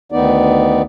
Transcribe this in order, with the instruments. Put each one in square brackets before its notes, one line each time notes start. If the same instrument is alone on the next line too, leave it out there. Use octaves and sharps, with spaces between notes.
[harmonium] D2 D#3 B3 D#4 D5